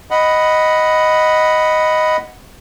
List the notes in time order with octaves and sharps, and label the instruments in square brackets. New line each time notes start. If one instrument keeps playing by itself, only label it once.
[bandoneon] D#5 F#5 B5